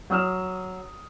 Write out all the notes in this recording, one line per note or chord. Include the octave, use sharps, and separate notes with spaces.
F#3 D#6 F6 E7